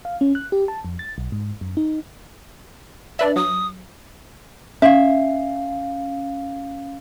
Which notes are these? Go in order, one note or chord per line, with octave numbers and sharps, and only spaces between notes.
F5
C#4
F#6
G4
A5
F2
A6
B1
G#2
F#2
D#4
D4 B4 D5 E5
F#3 D#6
C#4 E5 F5